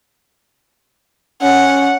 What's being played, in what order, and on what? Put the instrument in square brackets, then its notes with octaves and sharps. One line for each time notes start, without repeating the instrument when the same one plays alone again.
[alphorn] C#4 [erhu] F#5